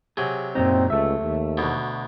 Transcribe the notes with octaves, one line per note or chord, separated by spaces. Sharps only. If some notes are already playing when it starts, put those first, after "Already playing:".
C3 F#3 G#4
F#2 A#2 C4 D#4
C#2 A3 E5
D#2
D2 B2